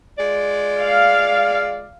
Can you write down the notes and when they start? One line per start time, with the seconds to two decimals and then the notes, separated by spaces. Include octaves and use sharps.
0.19 G#3 F4 D5
0.79 F5